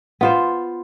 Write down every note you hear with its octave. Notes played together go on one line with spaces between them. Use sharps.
B3 F4 C5